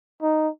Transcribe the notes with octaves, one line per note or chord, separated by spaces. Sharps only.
D#4